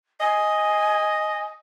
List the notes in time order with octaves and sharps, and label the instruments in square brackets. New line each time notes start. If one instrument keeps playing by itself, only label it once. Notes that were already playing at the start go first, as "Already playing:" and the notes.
[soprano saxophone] D#5 [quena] G#5